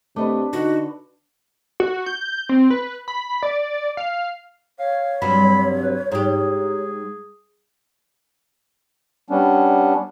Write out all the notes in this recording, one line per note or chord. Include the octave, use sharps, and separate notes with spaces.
C3 A3 D4 B4 D#5
D3 D#4 F#4
F#4
G6
C4
B4
B5
D5
F5
C#5 F5
G2 C3 F#3 B5
B4
G#2 G4 G#4
G3 B3 C#4 D4